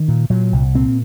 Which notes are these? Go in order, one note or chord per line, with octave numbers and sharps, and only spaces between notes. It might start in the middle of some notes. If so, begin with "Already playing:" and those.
Already playing: D#3
A#2
A#2 F#3
C2
A#2 C4